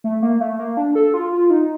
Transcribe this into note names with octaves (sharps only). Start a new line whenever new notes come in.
A3
A#3
A3
A#3
D4
A4
F4
F4
D#4